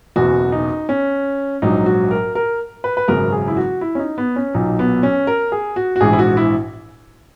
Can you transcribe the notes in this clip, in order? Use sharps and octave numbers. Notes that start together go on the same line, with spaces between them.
F#1 E2 B2 F#4
D#4
C#4
A#1 G#2 F#3 D#4
F#4
A#4
A#4
B4
B4
G#1 F#2 C#3 F#3 A#4
G#4
E4
F#4
E4
C#4
D#4
B3
C#4
B1 A#2 F#3 D#4
B3
C#4
A#4
G#4
F#4
F#4
A#1 G#2 E3 G#4
E4
F#4
E4